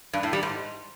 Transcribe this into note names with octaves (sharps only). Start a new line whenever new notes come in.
G2
A2
G3
G#2